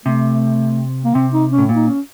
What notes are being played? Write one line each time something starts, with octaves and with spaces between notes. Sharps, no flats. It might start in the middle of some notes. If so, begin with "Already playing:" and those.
C3 A3
A#3
C3 C4
D#4
C#4
A2
A#2
D#4
C#4